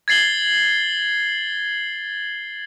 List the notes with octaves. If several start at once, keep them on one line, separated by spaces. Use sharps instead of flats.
G#6 A6 C7 F#7 G7